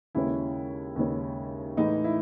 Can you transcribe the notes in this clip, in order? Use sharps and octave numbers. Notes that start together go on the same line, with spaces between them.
D#2 C#3 G#3 C#4 E4
D#2 C#3 G#3 C#4
A2 E3 G#3 D#4
E4